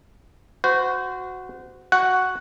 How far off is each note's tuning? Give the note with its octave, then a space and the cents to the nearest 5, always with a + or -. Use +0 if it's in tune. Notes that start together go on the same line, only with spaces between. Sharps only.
F#4 -5 C5 -30
F#4 +0 F#5 +0